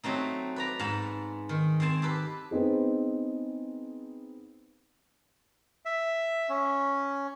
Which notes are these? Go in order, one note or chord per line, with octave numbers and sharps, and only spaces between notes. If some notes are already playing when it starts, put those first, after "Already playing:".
F#3 A3 C4 D#4
B4 D5 A#5
G#2 B3 A5 B5
D#3
C4 C5 G#5 A5
G4 A4 B4
B3 C4 D#4 G#4
E5
C#4